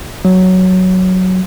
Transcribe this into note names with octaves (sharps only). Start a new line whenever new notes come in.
F#3